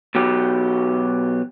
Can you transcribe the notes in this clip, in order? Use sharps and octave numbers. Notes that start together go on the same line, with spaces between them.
B2 F#3 G4